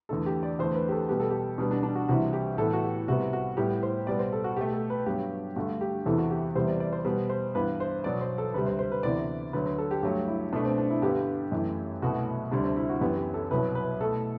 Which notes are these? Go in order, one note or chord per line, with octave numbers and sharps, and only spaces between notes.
E2 D3 A3 A4
G4
D5
E2 D3 A3 C5
B4
G4
A4
B2 G3 B3 G4
A4
G4
B2 G3 B3 D4
D4
D4
F#4
C2 C3 E3 G3 F#4
G4
A2 E3 B3 A4
F#4
G4
C2 C3 G3 B3 F#4
F#4
A2 G3 B3 G4
C5
B2 G3 B3 D5
C5
A4
F#4
B2 A3 G4
A4
B4
G2 F#3 B3 G4
G2 D3 A3 F#4
G4
E2 C3 E3 B3 A4
F#4
G4
E2 C3 G3 B3 C5
D5
D5
C5
B2 G3 B3 C5
C5
G2 E3 B3 B4
C5
B2 F#3 B3 D5
C5
A4
D2 C3 G3 B4
C5
C5
B4
D2 C3 E3 B3 D5
D2 D3 F#3 B4
B4
A4
G4
G2 F#3 A3 G4
E4
B2 A3 D4
C4
D4
E4
G2 D3 G3 B3 G4
F#2 E3 A3
C2 B2 A3 F#4
D2 C3 G3 D4
C4
E4
F#4
F#2 E3 B3 G4
G4
A4
C2 B2 F#3 B4
B4
B2 A3 A4